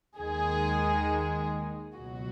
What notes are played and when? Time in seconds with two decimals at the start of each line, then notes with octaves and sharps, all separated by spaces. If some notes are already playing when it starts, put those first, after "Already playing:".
0.18 D#2 D#3 G#3 G#4
1.96 C#2 B2 F#3 F#4